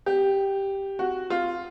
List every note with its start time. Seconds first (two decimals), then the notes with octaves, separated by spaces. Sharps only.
0.06 G4
0.99 F#4
1.30 F4